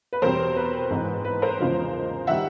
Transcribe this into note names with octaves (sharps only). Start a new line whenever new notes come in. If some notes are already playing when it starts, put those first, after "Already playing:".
B4
E2 B2 G3 C4 A#4 C5
B4
G#2 E3 G#3 C4
B4
A#4 C5
E2 C#3 F3 G#3
D#3 G3 E5 F#5